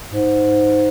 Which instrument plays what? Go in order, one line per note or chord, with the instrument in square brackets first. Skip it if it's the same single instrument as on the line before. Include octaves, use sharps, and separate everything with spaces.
[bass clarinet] G#2